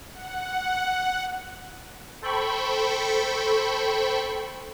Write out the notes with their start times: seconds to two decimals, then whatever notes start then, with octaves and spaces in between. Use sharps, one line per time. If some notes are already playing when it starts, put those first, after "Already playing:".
0.12 F#5
2.22 A4 C5 G5 B5 C#6